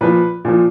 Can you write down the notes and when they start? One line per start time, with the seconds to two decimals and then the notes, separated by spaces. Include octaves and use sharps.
0.01 A#2 F3 B4
0.45 A#2 F3